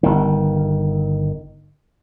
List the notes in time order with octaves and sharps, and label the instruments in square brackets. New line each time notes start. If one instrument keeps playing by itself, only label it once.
[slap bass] G1 D#3